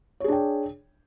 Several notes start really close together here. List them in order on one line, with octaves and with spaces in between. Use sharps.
C#5 G#4 D4 G5